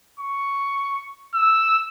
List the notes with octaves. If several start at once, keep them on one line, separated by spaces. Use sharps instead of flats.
C#6
E6